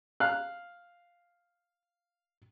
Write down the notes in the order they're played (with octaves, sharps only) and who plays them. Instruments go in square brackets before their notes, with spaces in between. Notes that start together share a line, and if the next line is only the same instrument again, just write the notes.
[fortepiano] F5 F#6